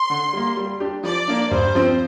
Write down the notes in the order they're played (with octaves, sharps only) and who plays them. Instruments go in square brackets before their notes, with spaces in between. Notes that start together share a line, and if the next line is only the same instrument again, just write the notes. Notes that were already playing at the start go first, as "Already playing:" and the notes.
Already playing: [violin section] C6
[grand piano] D3
G3 A#3
G3
D4 G4
[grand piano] F3 [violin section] D5
[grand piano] A#3 D4
[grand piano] G2 [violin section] C5
[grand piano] F3 C4